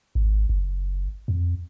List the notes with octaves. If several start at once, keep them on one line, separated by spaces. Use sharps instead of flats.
G#1
F#1
F2